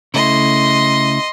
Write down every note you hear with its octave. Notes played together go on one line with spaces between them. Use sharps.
C#3 A3 E4 D#5 C6